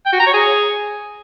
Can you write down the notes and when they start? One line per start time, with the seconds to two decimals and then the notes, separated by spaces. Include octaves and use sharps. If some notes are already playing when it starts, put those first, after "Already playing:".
0.06 G5
0.13 F#4
0.20 A#5
0.27 C#5
0.34 G#4